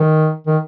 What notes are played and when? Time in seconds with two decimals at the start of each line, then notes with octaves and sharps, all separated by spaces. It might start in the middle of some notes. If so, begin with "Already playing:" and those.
Already playing: D#3
0.47 D#3